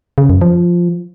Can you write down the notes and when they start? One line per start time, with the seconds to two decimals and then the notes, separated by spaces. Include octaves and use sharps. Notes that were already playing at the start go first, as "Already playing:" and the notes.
0.18 C#3
0.30 F#2
0.41 F3